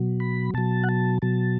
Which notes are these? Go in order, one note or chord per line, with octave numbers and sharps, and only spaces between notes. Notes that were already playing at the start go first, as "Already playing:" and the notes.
Already playing: B2 F#3
B5
B2 F#3 A5
F#5
A5
B2 F#3 A5